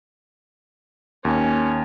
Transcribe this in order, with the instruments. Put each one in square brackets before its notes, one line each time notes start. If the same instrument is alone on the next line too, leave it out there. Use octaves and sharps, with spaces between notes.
[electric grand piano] D#2 [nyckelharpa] C#4